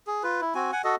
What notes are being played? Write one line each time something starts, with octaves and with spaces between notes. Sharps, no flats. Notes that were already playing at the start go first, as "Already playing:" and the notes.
G#4
F4 B4
E4
C4 F#4 G#5
F#5 G#5
F#4 A4 D#5